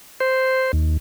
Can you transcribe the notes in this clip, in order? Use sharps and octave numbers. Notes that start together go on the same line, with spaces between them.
C5
D#2